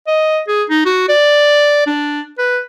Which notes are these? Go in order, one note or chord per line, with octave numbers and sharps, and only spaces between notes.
D#5
G#4
D#4
F#4
D5
D4
B4